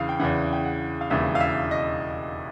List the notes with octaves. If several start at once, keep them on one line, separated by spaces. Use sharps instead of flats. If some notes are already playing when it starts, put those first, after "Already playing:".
Already playing: E2 C#3 E3 F5
G5
E2 C#3 E3 F#5
G5
F#5
F5
E1 D#2 C#3 E3 E5
F5
E5
D#5